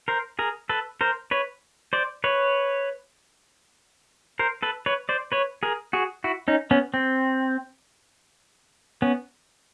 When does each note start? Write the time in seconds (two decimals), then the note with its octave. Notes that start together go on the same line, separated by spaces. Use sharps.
0.08 A#4 C5
0.39 G#4 A#4
0.69 A4 B4
1.01 A#4 C5
1.31 B4 C#5
1.93 C5 D5
2.24 B4 C#5
4.39 A#4 C5
4.62 A4 B4
4.86 B4 C#5
5.09 C5 D5
5.32 B4 C#5
5.63 G#4 A#4
5.93 F#4 G#4
6.24 E4 F#4
6.48 C#4 D#4
6.71 B3 C#4
6.94 C4
9.02 B3 C#4